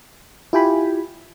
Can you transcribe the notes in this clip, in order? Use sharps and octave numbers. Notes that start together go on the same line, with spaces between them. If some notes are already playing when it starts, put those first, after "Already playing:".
E4 F4 G4 G5 G#5 B5